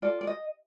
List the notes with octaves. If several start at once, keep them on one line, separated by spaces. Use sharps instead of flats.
F4 A4 D5
D5
D#5